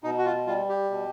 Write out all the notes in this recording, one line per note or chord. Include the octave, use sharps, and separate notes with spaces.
B2 D#4
F#4
F4
G3 F4
G4
B2